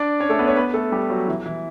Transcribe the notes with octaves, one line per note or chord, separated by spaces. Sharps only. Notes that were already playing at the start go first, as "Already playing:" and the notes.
Already playing: D4 D5
C#4 C#5
A3 A4
B3 B4
C#4 C#5
B3 B4
A3 A4
G3 G4
F#3 F#4
E3 E4
E3 E4